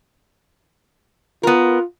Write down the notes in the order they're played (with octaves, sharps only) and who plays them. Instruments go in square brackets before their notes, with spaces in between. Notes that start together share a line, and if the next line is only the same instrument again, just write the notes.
[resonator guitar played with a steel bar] B3 A#4 [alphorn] F4